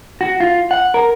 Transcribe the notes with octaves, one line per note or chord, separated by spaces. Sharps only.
F#4
F4
F#5
A#4